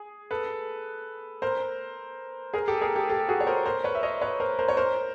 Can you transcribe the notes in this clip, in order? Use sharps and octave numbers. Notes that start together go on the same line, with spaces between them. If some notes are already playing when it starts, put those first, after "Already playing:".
Already playing: G#4
A4 B4
A#4 C5
G#4 A#4
G4 A4
G#4 A#4
G4 A4
G4 A4
F#4 G#4
C#5
A#4 C5
A#4 C5
B4 C#5
E5
C#5 D#5
B4 C#5
A#4 C5
A#4 C5
C#5
A#4 C5